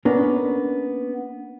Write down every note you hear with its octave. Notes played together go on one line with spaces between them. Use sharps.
A#3 B3 C#4 D4 A#4